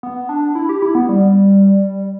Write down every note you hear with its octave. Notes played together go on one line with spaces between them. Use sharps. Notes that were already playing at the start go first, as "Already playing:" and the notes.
B3
D4
E4
G4
E4
B3
G3